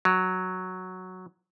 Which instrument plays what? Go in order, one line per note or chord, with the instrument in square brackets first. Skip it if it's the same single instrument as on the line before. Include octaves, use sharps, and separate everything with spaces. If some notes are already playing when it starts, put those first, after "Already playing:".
[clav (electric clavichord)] F#3